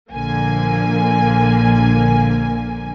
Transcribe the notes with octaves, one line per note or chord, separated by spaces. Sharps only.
A#1 D3 F3 A#3 G#5